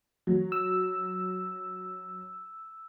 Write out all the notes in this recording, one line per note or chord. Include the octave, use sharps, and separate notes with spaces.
F#3
E6